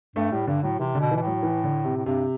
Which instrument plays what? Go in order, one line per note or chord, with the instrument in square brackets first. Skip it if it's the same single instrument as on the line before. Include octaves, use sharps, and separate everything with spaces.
[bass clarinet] G2 [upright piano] A3
[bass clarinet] A2 [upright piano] G3
[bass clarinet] G2 [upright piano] D3
[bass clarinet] A2 [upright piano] F#3
[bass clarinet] C3 [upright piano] E3
[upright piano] D3
[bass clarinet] B2
[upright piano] E3
[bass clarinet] B2
A2
[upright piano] F#3
E3
D3
C3
[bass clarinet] A2
[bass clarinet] G2 [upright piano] C3